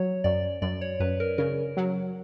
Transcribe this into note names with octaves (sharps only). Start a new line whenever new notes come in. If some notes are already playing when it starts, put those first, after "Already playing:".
Already playing: F#3 C#5
F#2 D5
F#2 D5
C#5
F#2 B4
A#4
C#3 A#4
F#3